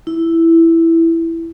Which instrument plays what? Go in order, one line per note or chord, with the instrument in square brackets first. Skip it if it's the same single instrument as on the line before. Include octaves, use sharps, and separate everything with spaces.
[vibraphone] E4